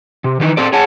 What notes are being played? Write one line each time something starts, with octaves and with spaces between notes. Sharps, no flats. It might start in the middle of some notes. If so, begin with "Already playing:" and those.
C3
D#3 E3 D#4
C4 A4 D5
G#4 C#5 F#5 A5